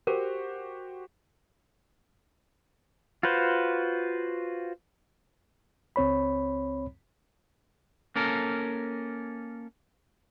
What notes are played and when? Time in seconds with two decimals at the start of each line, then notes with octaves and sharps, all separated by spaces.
0.07 F#4 G4 A#4 C5
3.23 F4 F#4 B4 C5
5.96 C#2 C4 C#5 B5
8.16 A#3 C#4 A4 A#4